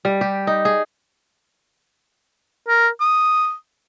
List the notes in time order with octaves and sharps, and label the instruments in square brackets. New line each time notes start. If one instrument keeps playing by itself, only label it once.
[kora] G3
G4
D#4
G#4
[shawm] A#4
D#6